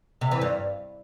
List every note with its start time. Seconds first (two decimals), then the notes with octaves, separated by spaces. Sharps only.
0.21 C3
0.31 E3
0.42 G2